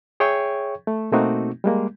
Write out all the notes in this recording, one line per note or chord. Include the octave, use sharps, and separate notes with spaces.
G#4 C#5 E5 G5 C#6 G#6
A3
B2 A3 A#3 C4 D#4 F#4
G3 G#3 A#3